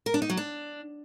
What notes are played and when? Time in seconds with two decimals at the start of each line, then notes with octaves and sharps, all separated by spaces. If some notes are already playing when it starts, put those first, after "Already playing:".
0.06 A#4
0.14 D4
0.22 D#4
0.30 F#3
0.37 D4